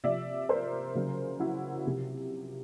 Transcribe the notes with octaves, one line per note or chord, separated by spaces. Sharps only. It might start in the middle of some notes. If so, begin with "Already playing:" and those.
C3 F3 D5 E5
A#4 C5
C#3 F#3
E4 F#4
C3 F3